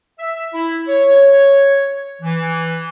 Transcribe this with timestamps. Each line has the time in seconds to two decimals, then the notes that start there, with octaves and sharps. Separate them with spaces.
0.19 E5
0.54 E4
0.88 C#5
2.22 E3